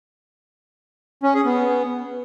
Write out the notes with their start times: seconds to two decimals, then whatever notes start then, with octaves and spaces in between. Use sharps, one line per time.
1.23 C#4
1.34 G#4
1.45 B3